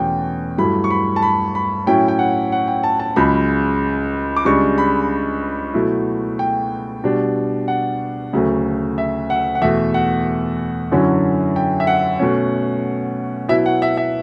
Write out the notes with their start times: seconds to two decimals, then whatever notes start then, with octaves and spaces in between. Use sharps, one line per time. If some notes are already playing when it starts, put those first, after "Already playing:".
Already playing: E2 B2 A3 C#4 G5
0.58 G2 F#3 A3 E4 B5
0.84 C#6
0.90 B5
1.16 A5
1.22 B5
1.55 B5
1.87 A2 F#3 C#4 E4 G5
2.08 G5
2.19 F#5
2.52 F#5
2.68 G5
2.83 A5
3.00 A5
3.16 C#2 C#3 F#3 B5
4.36 D6
4.45 C#2 C#3 G3 D4 C#6
4.78 B5
5.74 B2 F#3 A3 E4
6.39 G5
7.04 B2 G3 D4
7.68 F#5
8.33 D2 C#3 F#3 A3
8.98 E5
9.30 F#5
9.55 F#5
9.61 E2 B2 A3 E5
9.94 F#5
10.91 F#2 D3 F#3 C#4 E4
11.56 G5
11.80 E5
11.87 F#5
12.19 B2 A3 C#4
13.49 B2 F#3 B3 E4 E5
13.66 F#5
13.82 E5
13.97 E5